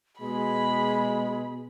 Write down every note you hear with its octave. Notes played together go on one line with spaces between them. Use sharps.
B2 G#3 G#4 B5